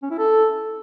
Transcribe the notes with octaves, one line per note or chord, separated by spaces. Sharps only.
C#4
E4
A4